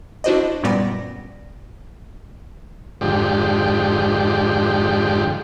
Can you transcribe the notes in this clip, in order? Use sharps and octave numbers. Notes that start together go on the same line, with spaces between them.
D4 E4 F#4 C5 D5 D#5
F#2 A#2 G3 B3 D5 A#6
F2 G#2 D3 G4